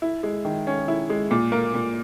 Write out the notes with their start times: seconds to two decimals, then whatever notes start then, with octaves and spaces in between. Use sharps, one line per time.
0.02 E4
0.23 G#3
0.45 D#3
0.67 C#4
0.88 E4
1.10 G#3
1.31 A#2
1.52 A#3
1.74 A#2